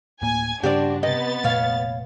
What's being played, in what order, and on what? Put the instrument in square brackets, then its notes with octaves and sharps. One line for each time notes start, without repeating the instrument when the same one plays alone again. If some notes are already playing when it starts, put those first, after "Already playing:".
[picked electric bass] D1 A2 A#3 [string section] G#5
[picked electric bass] G2 C#3 [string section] D4 [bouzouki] F#4 A#4 C5 [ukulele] G4 D5
[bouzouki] C3 [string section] B3 A6 [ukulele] D#5
[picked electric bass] F1 A#2 A3 [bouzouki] C#5 F5